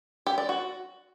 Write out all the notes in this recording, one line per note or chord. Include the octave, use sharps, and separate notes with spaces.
G4
D5
F#4